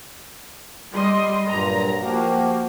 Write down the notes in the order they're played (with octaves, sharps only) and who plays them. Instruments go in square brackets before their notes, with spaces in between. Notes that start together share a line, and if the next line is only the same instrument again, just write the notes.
[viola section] G3 D#5 C6
[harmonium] G2 A#2 F#3 [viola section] A#5
[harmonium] F3 F#4 G4 [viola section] A#3